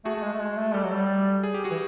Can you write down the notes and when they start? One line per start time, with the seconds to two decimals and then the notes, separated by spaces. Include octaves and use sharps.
0.05 A3 F#4 G#4
0.15 A3
0.22 G#3
0.33 A3
0.40 G#3
0.58 A3
0.74 G3 G4 A4
0.84 F#3
0.94 G3
1.43 G#4
1.54 G4
1.64 F#4 G#4
1.71 E3